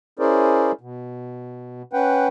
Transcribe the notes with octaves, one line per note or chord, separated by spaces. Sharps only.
C#4 E4 G#4 A#4 C5 D5
B2
C#4 B4 F#5 G5